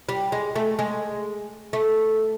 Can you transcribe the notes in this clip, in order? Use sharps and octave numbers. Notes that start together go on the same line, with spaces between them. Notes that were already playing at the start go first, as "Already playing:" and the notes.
G3
G#3
A3
G#3
A3